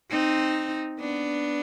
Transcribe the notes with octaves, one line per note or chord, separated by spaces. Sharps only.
C4 D#4
B3 D4